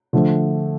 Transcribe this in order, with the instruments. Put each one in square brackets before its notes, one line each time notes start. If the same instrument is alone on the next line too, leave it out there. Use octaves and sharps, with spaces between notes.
[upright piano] D3 F3 A3